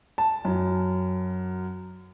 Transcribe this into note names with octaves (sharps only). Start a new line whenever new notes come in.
A5
F#2